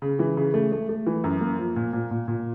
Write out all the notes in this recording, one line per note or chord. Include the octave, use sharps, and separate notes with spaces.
C#3
E3
C#3
A3
A3
A3
E3
F#2
A#3
F3
A#2
A#2
A#2
A#2